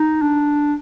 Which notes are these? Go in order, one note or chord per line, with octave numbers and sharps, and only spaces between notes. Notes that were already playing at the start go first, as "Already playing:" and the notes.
Already playing: D#4
D4